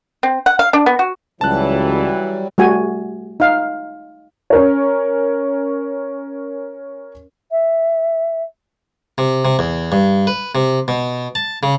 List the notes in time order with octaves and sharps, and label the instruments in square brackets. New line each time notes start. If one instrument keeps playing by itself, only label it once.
[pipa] C4
F#5
F5
D4
B3
F#4
[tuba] C#2 [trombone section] E3 [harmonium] F#3 G3 [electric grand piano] A5 F#6
[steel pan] G3 A3 F#4 G#5
D#4 F5
[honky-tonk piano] C#4 A#4 C#5
[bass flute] E5
[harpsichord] C3
C3
E2
G2
B4
C3
B2
A5
C#3